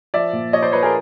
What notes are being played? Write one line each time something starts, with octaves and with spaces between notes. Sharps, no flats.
F3 D5 E5
A#2
F3 C#5 D#5
C5 D5
F3 B4 C#5
G#4 A#4